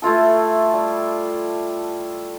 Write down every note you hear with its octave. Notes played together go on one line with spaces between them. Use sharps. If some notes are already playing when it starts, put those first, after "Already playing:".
A3 E4 F4 A4
G3